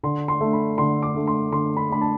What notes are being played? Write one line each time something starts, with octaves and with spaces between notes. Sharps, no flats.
D3 C6
C6
A3 D4
B5
D3 C6
D6
A3 D4
C6
D3 C6
B5
A3 D4 B5
A5